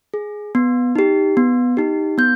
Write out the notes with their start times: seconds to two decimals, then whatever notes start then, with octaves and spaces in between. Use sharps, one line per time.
0.14 G#4
0.55 B3
0.96 D#4 G4
1.37 B3
1.77 D#4 G4
2.18 B3 G6